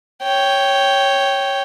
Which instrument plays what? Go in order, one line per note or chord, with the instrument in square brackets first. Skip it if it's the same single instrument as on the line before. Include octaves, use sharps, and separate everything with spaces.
[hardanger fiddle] C#5 G5